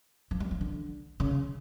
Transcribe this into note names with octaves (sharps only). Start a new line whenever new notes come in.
F3
G3
F3
D3
C#3